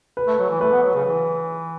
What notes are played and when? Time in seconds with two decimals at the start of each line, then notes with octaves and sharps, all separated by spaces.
0.17 B4
0.27 A3
0.39 F#3
0.50 E3
0.61 A3 B4
0.72 B3
0.83 F#3
0.94 C#3
1.06 E3